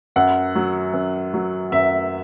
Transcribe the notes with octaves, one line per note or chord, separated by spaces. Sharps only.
F#2 F#5
F#3
F#2
F#3
F#2 E5